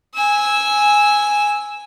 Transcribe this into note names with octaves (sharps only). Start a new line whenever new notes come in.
G#5 E6